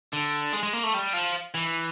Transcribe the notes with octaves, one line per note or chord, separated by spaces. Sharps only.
D3
G#3
G#3
A#3
A3
G3
F3
E3